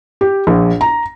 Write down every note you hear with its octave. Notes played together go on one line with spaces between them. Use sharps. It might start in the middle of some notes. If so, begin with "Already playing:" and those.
G4
A#1
A#5